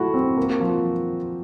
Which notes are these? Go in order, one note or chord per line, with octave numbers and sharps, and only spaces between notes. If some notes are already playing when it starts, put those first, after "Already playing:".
Already playing: A3 E4 F#4
C4
A#3
F3